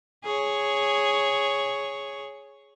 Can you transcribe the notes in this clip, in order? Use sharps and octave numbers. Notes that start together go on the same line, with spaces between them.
G#4 C#5